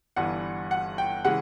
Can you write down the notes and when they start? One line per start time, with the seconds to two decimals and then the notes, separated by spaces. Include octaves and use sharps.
0.16 G1 G2 E3 F#5
0.71 F#5
0.98 G5
1.24 C#3 E3 G#3 F#5